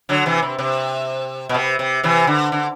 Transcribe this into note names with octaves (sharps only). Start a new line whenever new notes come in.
D3 F#3
C3 E3
C3
C3
B2
C3
C3
C3 E3
D3
D3